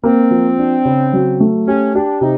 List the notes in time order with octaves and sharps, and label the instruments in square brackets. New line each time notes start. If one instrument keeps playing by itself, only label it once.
[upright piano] A#3 [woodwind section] C4
[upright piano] F3
D4
C#3
F#3
A3
[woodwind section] C#4 [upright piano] G4
[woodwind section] D4 [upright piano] G4
[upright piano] C3 [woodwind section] D#4